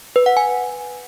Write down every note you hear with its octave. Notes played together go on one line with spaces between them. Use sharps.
B4
F#5
G#5